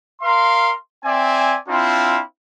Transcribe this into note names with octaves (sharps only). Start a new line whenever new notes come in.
A#4 F5 C6
C4 D5 E5 G#5
C4 D4 E4 F4 F5